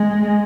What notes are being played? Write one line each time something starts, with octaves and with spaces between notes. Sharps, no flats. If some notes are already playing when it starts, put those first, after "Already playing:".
Already playing: G#3